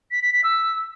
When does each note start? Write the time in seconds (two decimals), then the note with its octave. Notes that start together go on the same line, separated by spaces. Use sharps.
0.11 B6
0.22 B6
0.33 B6
0.44 E6